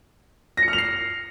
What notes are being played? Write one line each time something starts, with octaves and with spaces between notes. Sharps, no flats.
A#6
C#7
F6
F7
C7